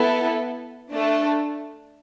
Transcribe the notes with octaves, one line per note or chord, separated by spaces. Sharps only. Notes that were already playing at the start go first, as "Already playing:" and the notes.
Already playing: B3 E4 A4
A3 D4 A4